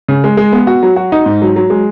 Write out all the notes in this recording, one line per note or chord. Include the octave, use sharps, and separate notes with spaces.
C#3
G#3
G#3
B3
F#4
F#3
F#4
D#4
G#2
F#3
F#3
G#3